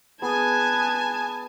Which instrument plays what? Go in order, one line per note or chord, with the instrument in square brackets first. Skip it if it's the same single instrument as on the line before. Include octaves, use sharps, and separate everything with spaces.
[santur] B3 G#4 [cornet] B4 [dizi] G#5 [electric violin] A5 G#6